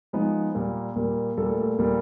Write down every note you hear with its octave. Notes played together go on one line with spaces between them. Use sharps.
F3 G#3 B3 D#4
A#2 G3 A#3
A#2 G3 A#3
A#2 G3 A3 A#3 A4
A3 A4
A#2 G3 A#3 A#4